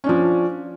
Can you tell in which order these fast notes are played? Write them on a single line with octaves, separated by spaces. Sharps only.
C#4 D4 F3